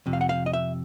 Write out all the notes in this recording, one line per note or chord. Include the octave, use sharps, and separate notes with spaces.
F2 C3
F5
F#5
F5
D#5
E5